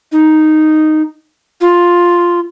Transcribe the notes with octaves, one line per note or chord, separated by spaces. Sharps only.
D#4
F4